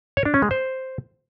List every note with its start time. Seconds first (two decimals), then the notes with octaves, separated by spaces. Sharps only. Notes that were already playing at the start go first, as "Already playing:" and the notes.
0.17 C#5
0.25 D4
0.34 C#4
0.42 G#3
0.51 C5